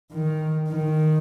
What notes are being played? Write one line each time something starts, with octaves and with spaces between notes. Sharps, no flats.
D#3
D#3